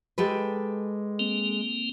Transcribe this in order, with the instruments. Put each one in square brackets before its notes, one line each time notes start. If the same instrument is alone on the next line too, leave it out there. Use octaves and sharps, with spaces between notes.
[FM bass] G#3 [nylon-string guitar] G4 A4 B4
[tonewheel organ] A#3 C4